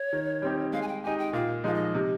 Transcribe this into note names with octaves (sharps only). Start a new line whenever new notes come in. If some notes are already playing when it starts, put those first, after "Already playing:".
Already playing: C#5
D#3
G3 C4 D#4 G4
G#3 F5
G#5
G5
D#4 G4 G#5
G5
A#2 F5
F3 G#3 D#4 F5
D#5
C3